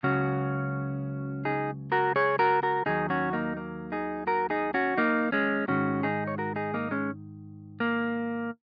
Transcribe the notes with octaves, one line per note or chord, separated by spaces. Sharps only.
C#2 C#3 F#3 C#4 F#4
D#4 G#4
F#4 A#4
G#4 C#5
F#4 A#4
F#4 A#4
D#2 D#3 F#3 D#4 G#4
C#4 F#4
A#3 D#4
A#3
D#4 G#4
F#4 A#4
D#4 G#4
C#4 F#4
A#3 D#4
G#3 C#4
G#2 D#3 G#3 C#4 F#4
D#4 G#4
C#5
F#4 A#4
D#4 G#4
A#3 D#4
G#3 C#4
A#3